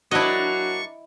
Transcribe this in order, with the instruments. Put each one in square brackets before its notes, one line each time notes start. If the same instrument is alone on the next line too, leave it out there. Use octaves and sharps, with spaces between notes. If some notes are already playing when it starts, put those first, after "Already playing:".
[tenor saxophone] F#3 [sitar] A#3 D4 [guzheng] E4 D#5 [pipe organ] C#6